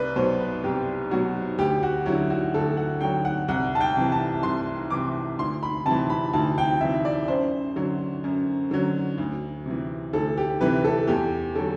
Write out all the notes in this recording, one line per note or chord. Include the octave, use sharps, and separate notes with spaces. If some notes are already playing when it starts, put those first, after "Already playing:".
Already playing: C2 B4 D5
B2 F#3 C5
B4
C2 G4
B2 F#3 F#4
D2 G4
F#4
D3 F#3 E4
F#4
D2 A4
F#5
D3 F#3 G5
F#5
C2 F#5
A5
G5
C3 E3
A5
C2 C6
C3 E3 D6
D2 C6
B5
C3 E3 A5
B5
D2 A5
G5
C3 E3 E5
D5
F#2 C5
D3 F#3
F#2
D3 F#3
D2
C3 E3
D2 A4
G4
C3 E3 B4
A4
E2 G4
D3 F#3 A4